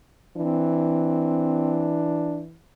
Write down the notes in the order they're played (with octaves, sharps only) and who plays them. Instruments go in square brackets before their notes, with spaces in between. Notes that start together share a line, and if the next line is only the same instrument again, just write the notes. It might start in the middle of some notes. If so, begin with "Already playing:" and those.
[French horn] E3 [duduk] C4 [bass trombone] D4